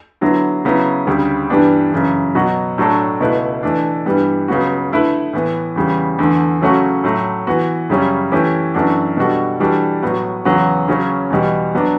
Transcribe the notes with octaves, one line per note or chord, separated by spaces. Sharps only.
D3 F#3 B3 E4
C#3 F#3 B3 E4
D2 C#3 G3
G2 E3 G3 B3 D4
F#2 C#3 E3
B2 F#3 B3 F#4
A2 F#3 A3 D4 A4
C#2 B2 A3 E4 B4
E3 A3 D4
G2 E3 G3 B3
C#2 C#3 F#3 B3 F#4
D3 A3 E4 B4
A2 E3 B3
E2 C#3 G3
E2 D3 A3
C#3 F#3 A3 C#4 F#4
A2 F#3 A3
E3 B3 F#4
F#2 C#3 G3 C#4
E3 A3 C#4 G4
F#2 E3 A3 D4 F#4
B2 G3 D4 F#4 A4
E3 G3 D4 F#4 A4
A2 F#3 B3 F#4
E2 C#3 F#3 B3 F#4
C#3 F#3 C#4
E2 B2 G3
F#3 B3 D4